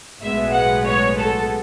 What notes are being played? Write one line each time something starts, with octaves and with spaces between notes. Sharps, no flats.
B1 A2 G#3 B3 E5
F#5
C#5
A4